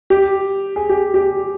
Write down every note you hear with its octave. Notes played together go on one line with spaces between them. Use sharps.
G4
G#4
G4
G4